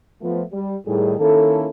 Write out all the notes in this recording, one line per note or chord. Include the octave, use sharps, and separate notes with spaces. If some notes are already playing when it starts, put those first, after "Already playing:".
F3 A3 B3
G3
A2 D#3 G3 G#4
D#3 A#3 C#4 E4 A4